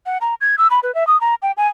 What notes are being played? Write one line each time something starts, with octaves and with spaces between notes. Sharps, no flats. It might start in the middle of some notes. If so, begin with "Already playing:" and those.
F#5
A#5
G#6
E6
B5
B4
E5
D#6
A#5
G5
G#5